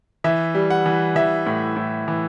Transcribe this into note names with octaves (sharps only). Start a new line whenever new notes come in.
E3 E5
G3
F#5
E3
E3 E5
A2
A2
E3